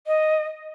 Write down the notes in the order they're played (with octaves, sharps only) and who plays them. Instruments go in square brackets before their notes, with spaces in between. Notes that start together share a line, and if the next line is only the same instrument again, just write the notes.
[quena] D#5